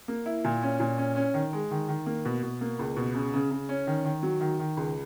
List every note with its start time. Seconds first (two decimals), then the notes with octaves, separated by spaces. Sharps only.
0.08 A#3
0.26 E4
0.45 A#2
0.63 C#4
0.80 A#2
0.98 C#4
1.16 C#4
1.34 D#3
1.53 G#3
1.71 D#3
1.89 D#3
2.06 A#3
2.25 B2
2.43 B2
2.61 A#3
2.79 C#2
2.96 B2
3.15 C#3
3.34 C#3
3.51 C#3
3.69 C#4
3.87 D#3
4.05 D#3
4.23 F#3
4.41 D#3
4.59 D#3
4.77 C#2